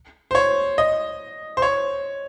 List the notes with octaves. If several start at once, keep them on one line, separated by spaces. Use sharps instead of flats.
C5
C#5
D#5
C5
C#5